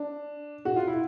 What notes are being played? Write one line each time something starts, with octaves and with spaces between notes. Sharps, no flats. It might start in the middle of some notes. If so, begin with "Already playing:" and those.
Already playing: D4
F#4
F4
E4